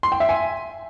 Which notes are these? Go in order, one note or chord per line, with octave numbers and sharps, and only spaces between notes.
C6
G5
E5
G#5